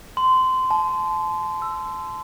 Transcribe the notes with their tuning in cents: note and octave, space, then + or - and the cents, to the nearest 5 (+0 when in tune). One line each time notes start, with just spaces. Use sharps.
C6 -20
A5 -30
E6 +15